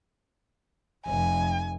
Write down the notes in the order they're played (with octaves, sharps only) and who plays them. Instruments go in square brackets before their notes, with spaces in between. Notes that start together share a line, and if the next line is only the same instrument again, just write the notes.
[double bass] F1 [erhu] G#5